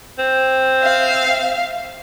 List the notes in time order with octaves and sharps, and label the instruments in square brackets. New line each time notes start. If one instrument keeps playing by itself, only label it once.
[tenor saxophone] C4
[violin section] E5 F5